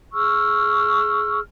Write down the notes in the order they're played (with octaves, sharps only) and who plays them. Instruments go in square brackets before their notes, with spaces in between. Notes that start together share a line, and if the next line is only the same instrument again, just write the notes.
[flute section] G#4 C#6 E6 F6